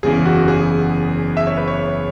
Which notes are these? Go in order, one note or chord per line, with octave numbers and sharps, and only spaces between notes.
F#1 E2 C#3 E3 G#4
F#4
G#4
E5
C#5
B4
C#5